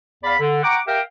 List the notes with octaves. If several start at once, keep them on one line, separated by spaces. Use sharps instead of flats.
E2 D5 F5 B5
D3
F#5 G5 A#5 C#6 D6
G4 A#4 E5 F5 G5